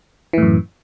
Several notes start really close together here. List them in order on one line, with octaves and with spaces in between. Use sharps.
E3 A2 F#2